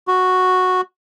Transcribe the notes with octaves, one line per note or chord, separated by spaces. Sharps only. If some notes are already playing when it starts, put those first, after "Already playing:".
F#4